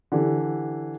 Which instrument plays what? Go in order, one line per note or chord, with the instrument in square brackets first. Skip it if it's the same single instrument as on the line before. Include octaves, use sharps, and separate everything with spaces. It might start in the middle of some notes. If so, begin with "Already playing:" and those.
[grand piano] D3 E3 G4